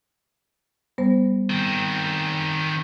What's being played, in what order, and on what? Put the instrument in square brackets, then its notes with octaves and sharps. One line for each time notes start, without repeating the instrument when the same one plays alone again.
[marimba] G3 B3 C5
[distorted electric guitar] D#3 C4